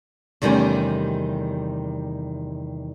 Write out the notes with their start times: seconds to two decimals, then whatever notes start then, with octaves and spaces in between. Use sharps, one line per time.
0.42 E2 C3 D#3 G3 A3 C#4